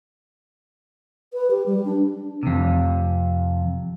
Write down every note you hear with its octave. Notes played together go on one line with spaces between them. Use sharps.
B4
G4
G3
D4
F2 C3